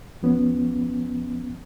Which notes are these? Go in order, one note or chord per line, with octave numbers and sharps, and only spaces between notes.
D#2 F3 B3 C#4